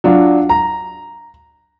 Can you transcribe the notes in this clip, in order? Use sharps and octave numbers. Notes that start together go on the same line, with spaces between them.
F#3 D4 F4
A#5